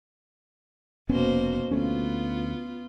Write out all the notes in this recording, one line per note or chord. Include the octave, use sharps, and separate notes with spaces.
F1 B2 A#3 B3 C#4 C5
D2 A3 B3 C#4 F4